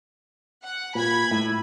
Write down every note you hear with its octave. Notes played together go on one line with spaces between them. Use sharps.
F#5
A#2 B5 G#6
A2